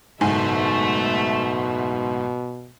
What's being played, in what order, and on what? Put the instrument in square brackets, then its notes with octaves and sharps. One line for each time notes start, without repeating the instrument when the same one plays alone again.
[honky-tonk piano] F#1 G#2 G#5 [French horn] B2 [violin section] A3 E5